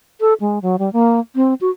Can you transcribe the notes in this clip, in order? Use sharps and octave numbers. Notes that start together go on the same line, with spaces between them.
A4
G#3
F#3
G3
A#3
C4
F#4